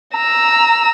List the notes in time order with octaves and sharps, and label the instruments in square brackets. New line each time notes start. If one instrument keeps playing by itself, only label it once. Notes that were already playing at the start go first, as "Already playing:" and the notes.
[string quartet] A#5 E6